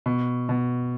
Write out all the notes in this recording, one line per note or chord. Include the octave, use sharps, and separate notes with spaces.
B2
B2